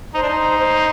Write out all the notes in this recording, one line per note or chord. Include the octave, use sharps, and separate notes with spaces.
D#4 C5
D4
D#4
C5